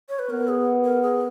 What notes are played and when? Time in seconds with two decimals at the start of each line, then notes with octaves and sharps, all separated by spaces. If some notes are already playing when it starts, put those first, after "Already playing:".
0.09 C#5
0.19 B4
0.30 B3 A#4
0.48 G#4
0.84 A#4
1.02 G#4